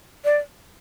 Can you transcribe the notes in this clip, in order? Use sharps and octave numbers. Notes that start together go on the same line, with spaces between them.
D5